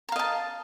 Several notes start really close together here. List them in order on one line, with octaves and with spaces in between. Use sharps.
A#5 F5 D#5 A5